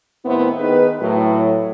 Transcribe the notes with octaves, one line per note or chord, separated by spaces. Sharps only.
D#2 A2 B3 C4 E4 C5
D#3 B3 D#4 G#4 B4
A2 F#3